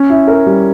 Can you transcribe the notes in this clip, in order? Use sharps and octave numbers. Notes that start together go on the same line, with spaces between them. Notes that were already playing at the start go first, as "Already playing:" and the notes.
Already playing: C#4
E4
A#4
G3